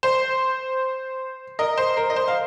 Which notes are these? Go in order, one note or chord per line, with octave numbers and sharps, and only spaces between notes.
C5
A#4 D#5
C5
A#4
D#5
C5
F5